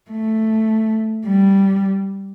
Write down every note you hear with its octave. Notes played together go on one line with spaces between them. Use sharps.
A3
G3